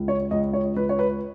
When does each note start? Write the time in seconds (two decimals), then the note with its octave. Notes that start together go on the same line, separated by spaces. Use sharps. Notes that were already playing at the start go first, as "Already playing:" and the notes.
Already playing: C#2
0.08 C#5
0.31 C#2 D#5
0.53 C#5
0.76 C#2 B4
0.89 C#5
0.99 B4